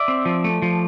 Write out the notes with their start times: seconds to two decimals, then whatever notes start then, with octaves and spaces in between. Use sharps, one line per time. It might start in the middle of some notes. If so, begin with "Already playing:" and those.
Already playing: D5 E5
0.08 C4
0.25 F3
0.44 A3
0.62 F3